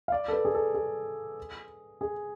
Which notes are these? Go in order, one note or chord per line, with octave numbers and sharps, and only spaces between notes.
F5
D5
A4
B4
G#4
A4
G#4
G#4